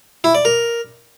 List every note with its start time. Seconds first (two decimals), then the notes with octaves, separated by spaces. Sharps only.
0.24 E4
0.35 D5
0.45 A#4